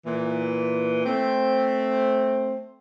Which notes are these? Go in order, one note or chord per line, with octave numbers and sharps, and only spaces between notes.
A#2 E3
A3 C4